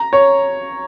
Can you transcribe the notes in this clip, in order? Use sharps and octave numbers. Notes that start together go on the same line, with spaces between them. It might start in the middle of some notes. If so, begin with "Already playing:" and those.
Already playing: A#5
C#5